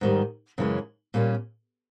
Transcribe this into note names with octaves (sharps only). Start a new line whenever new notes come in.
G#2 D#3 G3
F#2 C#3 E3 G#3 C#4
A#2 G3 A#3 C#4